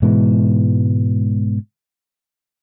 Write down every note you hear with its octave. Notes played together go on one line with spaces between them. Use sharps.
G#2 B2 E3 G#3